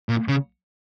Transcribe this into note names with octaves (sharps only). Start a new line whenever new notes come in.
A#2
C#3